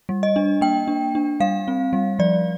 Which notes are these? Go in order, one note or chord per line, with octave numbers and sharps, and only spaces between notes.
G3
D#5
D4
A#3 G5
D4
D4
G3 F5
C4
G3
F3 D5